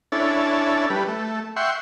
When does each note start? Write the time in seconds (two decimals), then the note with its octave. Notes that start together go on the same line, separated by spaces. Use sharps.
0.12 C#4 D4 E4 A4
0.90 G3 B4
1.08 A3
1.56 E5 F#5 G5 C6 C#6